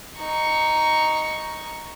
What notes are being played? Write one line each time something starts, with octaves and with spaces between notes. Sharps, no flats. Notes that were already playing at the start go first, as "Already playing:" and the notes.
D#4 C#6